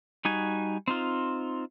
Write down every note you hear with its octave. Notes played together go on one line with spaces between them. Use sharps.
G3 D#4 F#4 G#5
C4 D#4 F4